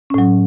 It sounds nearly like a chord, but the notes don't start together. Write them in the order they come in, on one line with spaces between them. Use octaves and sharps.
C#4 A2 F#3